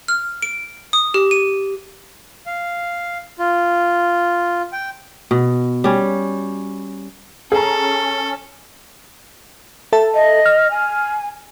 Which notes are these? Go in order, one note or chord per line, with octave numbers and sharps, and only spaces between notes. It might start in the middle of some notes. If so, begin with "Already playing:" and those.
F6
D7
D#6
G4
D#7
F5
F4
G5
B2
G3 C#4
C#4 G#4 A4 A#5
A4 E5 A5
D#5
F6
G#5